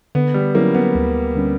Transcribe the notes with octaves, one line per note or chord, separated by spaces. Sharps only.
D3 B3
G3
F#3 A#3 C#4 E4
B3
D2
D3 G3 C#4